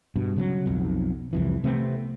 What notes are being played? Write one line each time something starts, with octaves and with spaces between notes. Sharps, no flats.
G2 B2
C#3 F3 F#3
B1 F2
C2 F2 E3
C3 A3 B3 C4